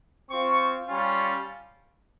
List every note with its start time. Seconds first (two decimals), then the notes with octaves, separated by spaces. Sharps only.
0.30 C4 F4 C#6
0.87 G3 C#4 F4